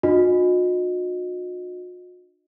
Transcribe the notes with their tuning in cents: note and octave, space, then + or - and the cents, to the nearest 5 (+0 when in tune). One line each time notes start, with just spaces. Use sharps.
D4 +35 F#4 -45 D#5 -10